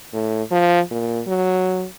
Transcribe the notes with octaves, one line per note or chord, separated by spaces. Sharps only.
A2
F3
A#2
F#3